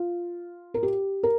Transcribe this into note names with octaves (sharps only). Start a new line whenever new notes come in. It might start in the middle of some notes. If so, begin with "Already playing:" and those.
Already playing: F4
A#4
G4
A#4